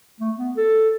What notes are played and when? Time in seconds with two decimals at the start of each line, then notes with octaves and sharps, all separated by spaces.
0.20 A3
0.38 B3
0.57 A4